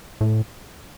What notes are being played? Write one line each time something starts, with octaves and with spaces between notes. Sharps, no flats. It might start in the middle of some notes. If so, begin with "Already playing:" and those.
A2